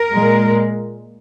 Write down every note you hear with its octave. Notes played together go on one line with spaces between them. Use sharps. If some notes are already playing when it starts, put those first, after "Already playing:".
Already playing: A#4
A#2 G#3